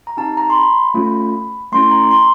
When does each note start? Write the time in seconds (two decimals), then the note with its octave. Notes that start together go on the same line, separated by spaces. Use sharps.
0.07 A#5
0.17 C4 D#4 G4 A5
0.37 A#5
0.50 C6
0.56 B5
0.94 A3 C#4 F4
1.72 A3 C#4 E4 C6
1.91 A#5
2.11 C6